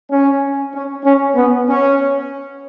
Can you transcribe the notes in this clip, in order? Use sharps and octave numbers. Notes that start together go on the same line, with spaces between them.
C#4
C#4
C#4
B3
C#4